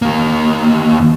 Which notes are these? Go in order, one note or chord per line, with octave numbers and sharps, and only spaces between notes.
D#2 A#3